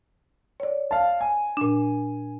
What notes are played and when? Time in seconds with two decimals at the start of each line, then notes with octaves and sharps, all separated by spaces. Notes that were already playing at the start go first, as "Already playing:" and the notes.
0.60 C#5 D5
0.91 F5 A5
1.21 G#5
1.57 A#2 D4